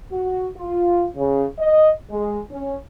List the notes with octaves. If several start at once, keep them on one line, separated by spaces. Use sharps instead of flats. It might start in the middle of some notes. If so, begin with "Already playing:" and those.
F#4
F4
C#3
D#5
G#3
C#4